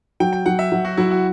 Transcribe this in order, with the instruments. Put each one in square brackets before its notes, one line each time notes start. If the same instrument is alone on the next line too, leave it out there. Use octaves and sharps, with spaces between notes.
[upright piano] F#3 [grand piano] G5
[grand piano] G5
[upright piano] F#3 [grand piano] F#5
[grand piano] E5
[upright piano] F#3
[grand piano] F#4
[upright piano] F#3 [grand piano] E4
[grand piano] F#4